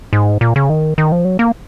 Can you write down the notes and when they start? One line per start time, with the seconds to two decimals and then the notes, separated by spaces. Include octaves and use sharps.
0.13 G#2
0.41 A#2
0.56 C#3
0.69 D#3
0.98 D#3
1.12 F3
1.25 F#3
1.39 A#3